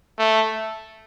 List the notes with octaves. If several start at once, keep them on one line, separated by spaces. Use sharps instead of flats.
A3